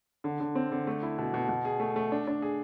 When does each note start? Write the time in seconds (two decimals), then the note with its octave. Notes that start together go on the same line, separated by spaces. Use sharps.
0.24 D3
0.40 D3
0.55 C4
0.72 D3
0.87 A3
1.03 E4
1.18 B2
1.34 B2
1.49 B2
1.65 G#4
1.80 A3
1.96 A3
2.12 D4
2.28 D4
2.42 G#4